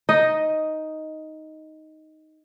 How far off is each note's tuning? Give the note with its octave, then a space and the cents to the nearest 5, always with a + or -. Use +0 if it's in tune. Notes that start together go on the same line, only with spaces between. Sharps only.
D#4 +5 D#5 +0